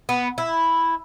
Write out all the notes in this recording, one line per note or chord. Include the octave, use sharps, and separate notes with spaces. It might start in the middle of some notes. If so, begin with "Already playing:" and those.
B3
E4